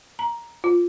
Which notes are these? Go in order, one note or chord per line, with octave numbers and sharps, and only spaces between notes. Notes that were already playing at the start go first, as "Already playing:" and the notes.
A#5
F4